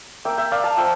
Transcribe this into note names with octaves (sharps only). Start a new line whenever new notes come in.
A#3 E5 G5
E5 G5
A#3 D5 F5
F5 A5
F3 E5 G5